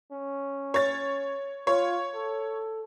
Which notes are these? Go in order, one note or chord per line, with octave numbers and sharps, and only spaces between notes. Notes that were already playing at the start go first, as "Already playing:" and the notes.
C#4
C#5 A6
F4 C#5
A4